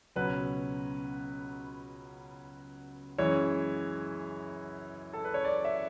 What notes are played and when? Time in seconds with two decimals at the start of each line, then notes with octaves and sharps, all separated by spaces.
0.16 C#2 B2 F#3 C#4 B4
3.18 F#2 E3 G#3 C#5
5.13 A4
5.25 B4
5.34 C#5
5.45 D5
5.65 E5